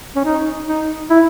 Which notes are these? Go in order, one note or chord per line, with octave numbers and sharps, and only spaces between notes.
C#4
D#4
D#4
E4